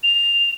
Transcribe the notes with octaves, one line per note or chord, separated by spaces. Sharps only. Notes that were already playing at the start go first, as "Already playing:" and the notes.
F7